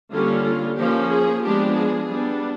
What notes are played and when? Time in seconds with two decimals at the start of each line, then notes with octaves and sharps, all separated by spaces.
0.12 D3 G3 A#3 C#4 F4
0.45 F4
0.77 F3 A#3 C#4 G4
1.11 G#4
1.44 F3 G#3 B3 D4 G4
1.77 G#4
2.10 G3 B3 D4